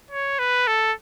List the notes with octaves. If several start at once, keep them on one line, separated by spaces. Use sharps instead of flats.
C#5
B4
A4